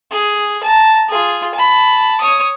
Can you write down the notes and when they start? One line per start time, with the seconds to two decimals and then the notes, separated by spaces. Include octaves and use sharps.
0.12 G#4
0.64 A5 A#5
1.09 F4 G#4
1.55 A5 B5
2.21 C#5 D#6